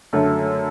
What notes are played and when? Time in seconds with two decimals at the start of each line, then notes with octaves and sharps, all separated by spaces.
0.13 F#2 D3 A3